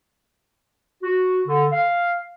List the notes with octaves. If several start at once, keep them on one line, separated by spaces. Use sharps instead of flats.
F#4
D3
F5